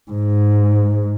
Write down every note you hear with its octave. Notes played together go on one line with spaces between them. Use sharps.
G#2